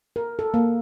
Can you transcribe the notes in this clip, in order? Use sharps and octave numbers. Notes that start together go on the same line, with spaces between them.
A#4
A4
A#3